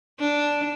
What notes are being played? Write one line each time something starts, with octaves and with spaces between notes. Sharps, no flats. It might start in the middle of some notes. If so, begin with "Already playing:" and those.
D4